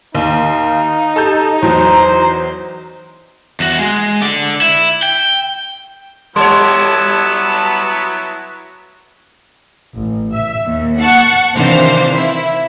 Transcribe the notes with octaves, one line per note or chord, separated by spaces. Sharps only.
D#2 D#4 F5
G4 A4 A5 G6
E2 F#3 C5 A#5
E2 F#4
G#3
D3 D5
E4
G5
F#3 G3 B3 E4 C#5 A5 C6
A1
E5
D#2
F#5 A5 C#6
C3 D#3 E3 D4 C5 F5
E4